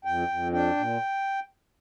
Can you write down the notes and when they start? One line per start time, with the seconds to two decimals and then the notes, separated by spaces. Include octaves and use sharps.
0.05 F2 G5
0.28 F2
0.52 D4 G5
0.77 A#2